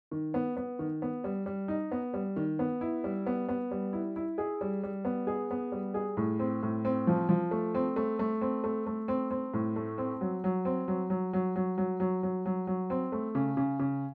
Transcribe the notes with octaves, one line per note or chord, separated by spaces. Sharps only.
D#3
B3
B3
D#3
B3
G3
G3
D#4
B3
G3
D#3
B3
E4
G3
B3
B3
G3
E4
E4
G#4
G3
G3
B3
G#4
B3
G3
G#4
A2
C4
A2
C4
F3
F3
A3
C4
A3
A3
C4
A3
A3
C4
C4
A2
A3
C4
F#3
F#3
C4
F#3
F#3
F#3
F#3
F#3
F#3
F#3
F#3
F#3
C4
A3
C#3
C#3
C#3